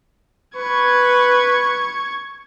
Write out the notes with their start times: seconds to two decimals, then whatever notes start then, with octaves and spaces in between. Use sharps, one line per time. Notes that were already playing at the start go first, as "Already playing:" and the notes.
0.56 B4 C#6 G#6